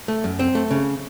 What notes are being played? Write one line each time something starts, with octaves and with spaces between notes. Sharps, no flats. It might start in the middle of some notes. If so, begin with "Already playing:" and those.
A3
F#2
C4
A3
C#3